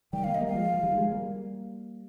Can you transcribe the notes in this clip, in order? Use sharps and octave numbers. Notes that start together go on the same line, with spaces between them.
D#3 G3 G5
G3 A#3 F5
D#5
G3 A#3 F5
F3 G#3
F3
D#3 G3
F3 G#3
G3 A#3